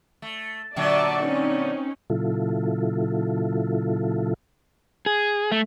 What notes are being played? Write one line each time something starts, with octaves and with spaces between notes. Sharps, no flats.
A3
A#2 D3 F#3 D5 E5 A5
C4 C#4 D#4
A#2 C#3 F#3 E4 F4 A4
G#4
A3